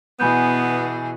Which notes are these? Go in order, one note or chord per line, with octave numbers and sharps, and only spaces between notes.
B2 E3 B3 G#4 G#5 B5 G6